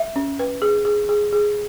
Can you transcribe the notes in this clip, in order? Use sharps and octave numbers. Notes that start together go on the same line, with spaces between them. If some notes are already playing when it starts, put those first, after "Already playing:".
Already playing: E5
C#4
B4
G#4
G#4
G#4
G#4